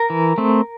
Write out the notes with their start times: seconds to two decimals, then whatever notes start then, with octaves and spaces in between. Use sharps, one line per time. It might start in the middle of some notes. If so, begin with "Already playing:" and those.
Already playing: A#4
0.10 E3
0.38 A3 C4